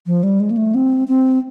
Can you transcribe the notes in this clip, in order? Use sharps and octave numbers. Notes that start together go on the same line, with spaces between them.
F3
G3
G#3
A#3
A3
C4
C4